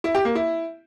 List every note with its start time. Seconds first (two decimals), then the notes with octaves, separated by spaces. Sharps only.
0.04 E4
0.15 G4
0.25 A#3
0.35 E4